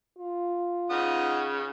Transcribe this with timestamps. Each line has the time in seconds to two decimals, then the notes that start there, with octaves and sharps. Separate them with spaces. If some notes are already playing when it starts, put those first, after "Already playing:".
0.18 F4
0.90 C#3 D#4 F#5 D#6